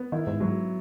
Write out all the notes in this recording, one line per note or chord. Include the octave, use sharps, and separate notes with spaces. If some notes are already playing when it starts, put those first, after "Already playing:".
Already playing: B3
D#3 E4
G#2
G#2 F#3